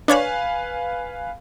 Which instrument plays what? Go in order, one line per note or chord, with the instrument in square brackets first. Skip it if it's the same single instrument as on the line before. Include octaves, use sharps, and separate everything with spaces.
[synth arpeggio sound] D4 C#5 B5 [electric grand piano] B4 F5 G#5